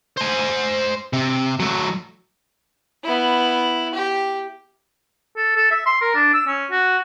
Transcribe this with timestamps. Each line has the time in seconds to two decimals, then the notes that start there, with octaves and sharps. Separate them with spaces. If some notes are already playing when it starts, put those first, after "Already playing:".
0.17 C5 G#5
1.13 C3
1.60 F#3 A3
3.04 B3 E4
3.95 G4
5.37 A4
5.56 A4
5.71 E5
5.86 C6
6.01 A#4
6.14 D4
6.34 E6
6.47 C#4
6.71 F#4